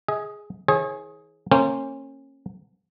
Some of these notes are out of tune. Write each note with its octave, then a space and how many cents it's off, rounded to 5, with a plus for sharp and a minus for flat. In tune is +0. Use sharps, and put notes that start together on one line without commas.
G#4 +0 D#5 +40
E3 -45 G#4 +10 C#5 -35
A#3 -30 C#4 -30 C5 +0